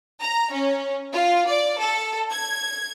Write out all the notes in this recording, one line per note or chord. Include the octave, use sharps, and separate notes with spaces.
A#5
C#4
F4
D5
A4
G#6